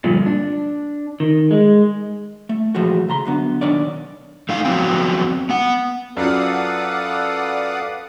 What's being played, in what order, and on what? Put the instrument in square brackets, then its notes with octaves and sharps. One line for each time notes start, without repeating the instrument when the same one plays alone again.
[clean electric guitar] G2 A#2 D3 F3 D4
D4
D#3
G#3
[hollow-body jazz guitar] A3
A#2 E3 F3 G#3 A3 F#4
C#3 A#5 C6
F#2 D3 B3
B1 D#3 D4 A#4 C#5 D5
[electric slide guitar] A3 D#4 F5
F2 E3 F#3 B3 C4 G5
B3 F#5
[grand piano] F#2 F4 [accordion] A4 B4 F5 [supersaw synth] D5 F#5 D#6